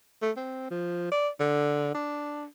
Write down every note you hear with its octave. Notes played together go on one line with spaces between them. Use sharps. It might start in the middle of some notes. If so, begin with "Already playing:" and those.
A3
C4
F3
D5
D3
D4